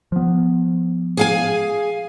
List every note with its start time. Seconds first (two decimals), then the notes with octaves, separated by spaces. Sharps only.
0.12 F3 B3
1.17 G#4 F5 G#5